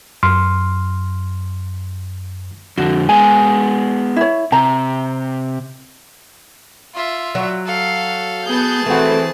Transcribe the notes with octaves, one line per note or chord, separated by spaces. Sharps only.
F#2 C6 F6
F2 D3 F#4
G#3 B3 G#5
E4 C#5
C3 A#5
F4 E5
F#3
A4 F5
B3 G#4 A5 G6
E3 A3 C4 F#4